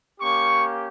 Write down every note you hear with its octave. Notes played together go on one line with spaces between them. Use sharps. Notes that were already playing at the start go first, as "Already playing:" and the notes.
A#3 C#4 G4 C#6